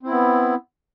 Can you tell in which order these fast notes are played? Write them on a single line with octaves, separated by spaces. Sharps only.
C4 E4 B3